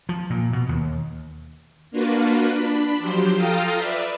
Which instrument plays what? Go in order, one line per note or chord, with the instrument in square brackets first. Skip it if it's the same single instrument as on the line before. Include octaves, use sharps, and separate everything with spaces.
[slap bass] F3
A#2
B2
D#2
[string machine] A#3 D4 F4 F#4 B4
D4 B5
F3 F#3 G4 C5 C6
F4 A4 F5 G5 A#5 D#6
B4 D5 E5